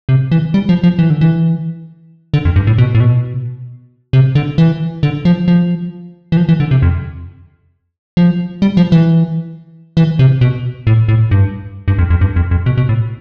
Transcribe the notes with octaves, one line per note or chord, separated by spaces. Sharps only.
C3
E3
G3
F3
F3
E3
D3
E3
D3
F2
G2
A2
B2
A2
B2
C3
D3
E3
D3
F3
F3
E3
F3
E3
D3
C3
F2
F3
G3
F3
E3
E3
C3
B2
A2
A2
G2
G2
F2
F2
G2
F2
F2
B2
B2
A2